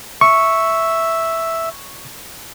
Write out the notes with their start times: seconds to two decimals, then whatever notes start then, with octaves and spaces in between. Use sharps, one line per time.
0.21 E5 C#6